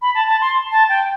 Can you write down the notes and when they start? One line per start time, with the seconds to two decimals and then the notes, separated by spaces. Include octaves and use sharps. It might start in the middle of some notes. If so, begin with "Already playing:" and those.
0.02 B5
0.15 A5
0.27 A5
0.41 C6
0.72 A5
0.89 G5